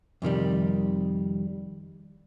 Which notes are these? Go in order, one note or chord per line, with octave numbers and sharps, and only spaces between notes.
F2 C3 D#3 G3